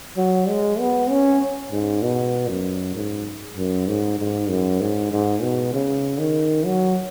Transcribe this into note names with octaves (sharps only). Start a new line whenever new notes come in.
F#3
G#3
B3
C#4
G#2
B2
F#2
G#2
F#2
G#2
G#2
F#2
G#2
G#2
B2
C#3
D#3
F#3